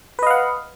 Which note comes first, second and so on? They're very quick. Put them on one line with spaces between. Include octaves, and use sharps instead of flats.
B4 D#5 F5 F#5